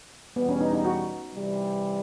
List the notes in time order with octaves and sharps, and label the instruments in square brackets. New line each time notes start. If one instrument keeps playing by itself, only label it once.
[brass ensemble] E2 B2 G3 [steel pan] B3
[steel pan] C#4
D#4
D#4
F#4
[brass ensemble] C3 E3 G3 C4